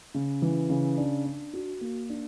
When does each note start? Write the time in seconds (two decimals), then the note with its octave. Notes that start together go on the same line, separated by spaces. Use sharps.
0.14 C#3
0.42 E3
0.70 C#3
0.98 D4
1.26 D4
1.53 F#4
1.81 A#3
2.10 D4